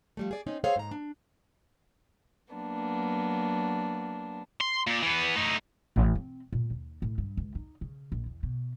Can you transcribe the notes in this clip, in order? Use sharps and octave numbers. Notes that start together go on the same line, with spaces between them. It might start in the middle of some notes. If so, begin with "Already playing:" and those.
F3 G3 A3
G#4 D5
C4 C#4 D#4
G#4 A4 C5 C#5 F5
G#2 A#5
D4
F#3 A#3 B3 D4
C6
A#2
E3 B3
A3 D#4
A1
C4
A#2
D#2
A2
G2
C#2
D#4
C#3
A#1
E2
B2